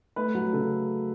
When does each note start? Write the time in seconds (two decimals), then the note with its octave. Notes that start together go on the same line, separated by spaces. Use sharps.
0.16 A3 B4
0.35 F#3
0.53 C#3 A4